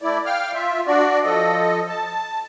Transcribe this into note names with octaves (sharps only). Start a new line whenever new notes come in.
A3 E4 D5
F5 G5 F6
F4 E5
D4 F#4 D5
F3 A4 D#5
A5